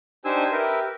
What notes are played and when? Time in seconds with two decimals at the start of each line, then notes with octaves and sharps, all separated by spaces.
0.25 D4 D#4 G4 C5 G#5 E6
0.52 G4 A#4 B4 E5